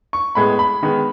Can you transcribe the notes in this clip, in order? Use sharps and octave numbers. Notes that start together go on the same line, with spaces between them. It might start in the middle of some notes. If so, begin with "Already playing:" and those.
C#6
A2 G#3 B3 B5
B5
D#3 G#3 B3